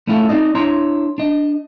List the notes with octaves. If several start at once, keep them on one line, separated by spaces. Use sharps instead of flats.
A3 C#4 E4 F4 G4 A4
C4 D#4 D5 D#5
D4 E4 C#5 A#5 C6
D4 D#5